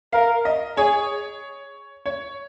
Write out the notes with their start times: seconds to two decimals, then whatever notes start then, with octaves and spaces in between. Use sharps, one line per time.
0.13 A#4 F5
0.45 D#5
0.77 G#4 C#5
2.06 C#5